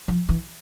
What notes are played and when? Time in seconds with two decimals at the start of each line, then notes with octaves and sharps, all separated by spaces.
0.08 F3
0.29 E3